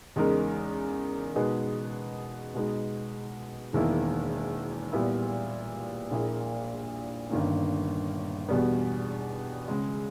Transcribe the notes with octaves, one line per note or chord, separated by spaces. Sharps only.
E2 C#3 G#3 D#4 A#4
B2 G#3 D#4 G#4 B4
B2 G#3 B3 D#4
E1 E2 D#3 A#3 E4
A#2 G3 B3 E4
A#1 A#2 A#3 E4 G#4
G1 G2 D#3 A#3 C#4
E2 B2 G3 B3
C#2 C#3 G#3